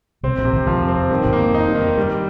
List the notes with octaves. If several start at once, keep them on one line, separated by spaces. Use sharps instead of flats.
C2 C3 C4
A#1 A#2
C3
G#1 G#2
G#1 G#2 F3
F2
C4
F2
G2 D#3
G#1 G#2
A#3
G2
F2 D#4
G2
D#3
F2
G2 G3